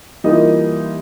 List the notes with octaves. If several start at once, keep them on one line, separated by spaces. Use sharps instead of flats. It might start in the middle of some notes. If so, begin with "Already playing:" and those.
E3 G3 A#3 D#4 F4 D#5